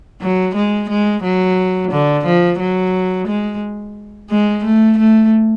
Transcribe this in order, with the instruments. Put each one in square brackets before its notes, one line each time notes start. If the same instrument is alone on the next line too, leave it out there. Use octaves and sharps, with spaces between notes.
[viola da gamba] F#3
G#3
G#3
F#3
D3
F3
F#3
G#3
G#3
A3
A3